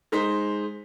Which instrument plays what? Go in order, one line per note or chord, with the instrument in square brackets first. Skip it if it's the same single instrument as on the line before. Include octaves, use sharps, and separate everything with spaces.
[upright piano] G#3 D#4 C5 B6